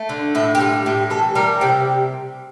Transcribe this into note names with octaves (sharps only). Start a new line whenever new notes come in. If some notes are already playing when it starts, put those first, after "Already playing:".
Already playing: A3
D3
A2 E4
G4
G3 F4
A2 G4
E3 A4
G3 A#4
C3 G5